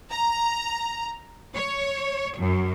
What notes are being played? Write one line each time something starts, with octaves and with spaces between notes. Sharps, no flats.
A#5
C#5
F#2